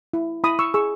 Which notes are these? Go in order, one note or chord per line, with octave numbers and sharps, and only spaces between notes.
E4
E4 B5 D#6
C#6 E6
G#4 C#6 E6